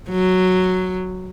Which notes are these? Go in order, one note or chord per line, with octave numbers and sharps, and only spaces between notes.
F#3